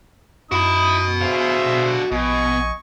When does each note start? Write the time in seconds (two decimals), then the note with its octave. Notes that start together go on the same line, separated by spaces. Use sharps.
0.52 F#2 D#4 E4 F#4 B5 D#6
1.21 D3 G#4 C5 E5 F5
1.65 B2
2.12 A#1 B2 D#5 G#5 C#6